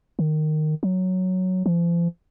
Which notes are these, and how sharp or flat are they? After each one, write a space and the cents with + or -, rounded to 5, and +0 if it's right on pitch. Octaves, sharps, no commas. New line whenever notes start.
D#3 -15
F#3 +0
F3 -40